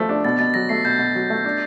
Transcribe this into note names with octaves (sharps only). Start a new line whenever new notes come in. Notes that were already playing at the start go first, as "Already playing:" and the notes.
Already playing: F3 A3
D4
B2 A6
B2 A6
F#3 A#6
A3 C7
B2 G6
B2
F#3
A3
D4